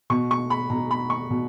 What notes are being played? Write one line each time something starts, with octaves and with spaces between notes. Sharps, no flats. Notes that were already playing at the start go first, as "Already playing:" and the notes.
B2 C#6
C#6
B5
B2 A#5
B5
C#6
B2